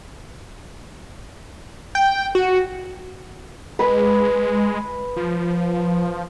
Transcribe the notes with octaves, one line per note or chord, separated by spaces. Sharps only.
G5
F#4
G#3 B4
F3